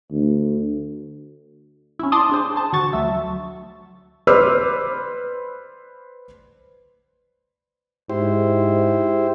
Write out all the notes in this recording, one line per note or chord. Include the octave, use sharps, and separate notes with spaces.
D2
C#4 E4
D5 A5 C6 D6 D#6
D4 G#4 C5
C5 A5
D3 F#4 C#6 A6
D2 F#3 E5
B4 C5 D5 D6 E6 F6
G#2 E4 G4 C5